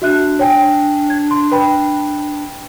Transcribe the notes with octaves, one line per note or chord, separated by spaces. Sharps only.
D4 F#4 E5 F#6
C#5 G5 G#5
G#6
C6
B4 G5 B5